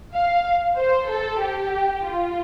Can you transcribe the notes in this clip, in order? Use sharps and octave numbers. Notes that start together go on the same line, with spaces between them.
F5
C5
A4
G4
F4